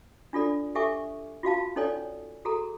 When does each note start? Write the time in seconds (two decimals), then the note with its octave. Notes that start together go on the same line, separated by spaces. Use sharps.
0.33 D4 F4 A4 D5
0.75 G4 A4 E5 G#5 C#6 D6
1.43 F4 F#4 F5 A5
1.76 C#4 D#4 A4 C#5 D5 G#5
2.45 F#4 G#4 A4 A#5